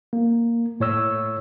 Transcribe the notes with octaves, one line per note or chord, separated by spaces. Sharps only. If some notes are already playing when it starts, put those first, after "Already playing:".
A#3
A2 C#5 E6